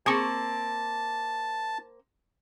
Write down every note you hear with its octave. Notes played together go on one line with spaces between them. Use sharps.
A#3 C4 G#4 A5 C#6